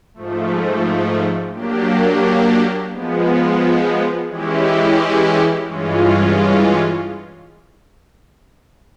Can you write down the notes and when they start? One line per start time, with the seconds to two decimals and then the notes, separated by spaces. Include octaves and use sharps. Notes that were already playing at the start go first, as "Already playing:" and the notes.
0.14 G#2 F3 A3
1.53 F#3 A#3 D4 G4
2.91 F3 G#3 B3
4.29 E3 G#3 C#4 E4 G4
5.67 G2 E3 G#3 C#4 F4